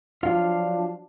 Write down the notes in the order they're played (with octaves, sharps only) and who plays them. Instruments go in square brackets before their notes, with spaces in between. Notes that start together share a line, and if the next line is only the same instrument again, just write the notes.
[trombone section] F3 F#3 D4 [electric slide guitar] F4 F5